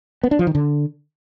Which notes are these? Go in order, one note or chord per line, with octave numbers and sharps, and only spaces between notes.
B3
D4
F3
D#3
D3